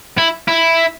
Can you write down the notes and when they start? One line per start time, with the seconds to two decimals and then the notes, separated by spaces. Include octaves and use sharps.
0.18 E4
0.48 E4